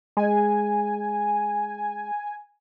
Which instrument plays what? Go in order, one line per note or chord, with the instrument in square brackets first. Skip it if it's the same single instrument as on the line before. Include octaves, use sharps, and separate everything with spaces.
[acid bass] G#3 [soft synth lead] G#5